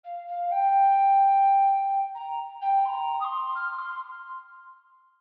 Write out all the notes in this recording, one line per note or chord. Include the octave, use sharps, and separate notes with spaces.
F5
F5
G5
A#5
G5
C6
A#5
D#6
C6
F6
C6